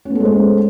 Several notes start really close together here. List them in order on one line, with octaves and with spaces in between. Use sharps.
C#4 B3 A4 G#3 C5